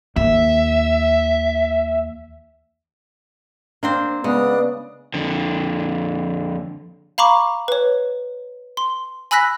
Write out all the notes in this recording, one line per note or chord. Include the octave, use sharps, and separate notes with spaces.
D#2 E5
A#3 C4 D4 C5
C#3 G#3 B3 D5 D#6 F#6
F2 D3
F5 A#5 B5 C#6 D6
B4 C#5
C6
G#5 B5 E6 F#6 A#6 B6